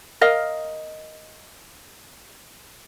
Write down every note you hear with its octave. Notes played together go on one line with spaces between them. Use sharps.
A#4 D#5 F5